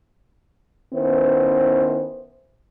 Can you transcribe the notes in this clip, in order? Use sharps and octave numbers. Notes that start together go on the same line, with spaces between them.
D#3 B3 C#4 E4 C5